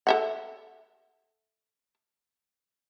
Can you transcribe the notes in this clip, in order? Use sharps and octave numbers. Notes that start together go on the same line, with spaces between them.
A4 E5 F#5